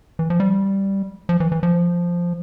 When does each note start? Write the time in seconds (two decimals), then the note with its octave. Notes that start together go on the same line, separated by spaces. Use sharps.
0.19 E3
0.30 F3
0.40 G3
1.29 F3
1.40 E3
1.52 E3
1.63 F3